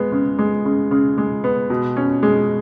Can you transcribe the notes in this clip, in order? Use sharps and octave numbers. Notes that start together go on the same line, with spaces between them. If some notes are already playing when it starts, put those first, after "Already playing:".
Already playing: G#3 B3
C#3
G#3
C#3
C#3
G#3
B3
B2
C#4
G#3